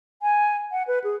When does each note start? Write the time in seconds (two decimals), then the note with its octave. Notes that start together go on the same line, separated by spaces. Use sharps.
0.22 G#5
0.71 F#5
0.88 B4
1.04 G#4